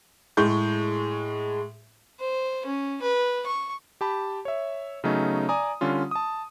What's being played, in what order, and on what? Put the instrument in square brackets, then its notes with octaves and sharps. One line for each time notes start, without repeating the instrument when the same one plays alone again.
[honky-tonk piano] A2 G#3 C#6 G6
[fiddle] C5
C#4
B4
C#6
[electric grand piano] G4 A5 B5
C#5 E5
C#3 F#3 A3 B3 C#4 D#4
D5 G#5 A#5 D#6
D3 G3 C#4 F4
A5 D#6